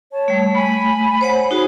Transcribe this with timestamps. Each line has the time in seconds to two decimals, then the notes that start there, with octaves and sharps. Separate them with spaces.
0.12 C#5 A5
0.28 G3 A3
0.55 A3 G#5 B5
1.21 C5 C#5 F#5
1.51 D#4 F#4 G#4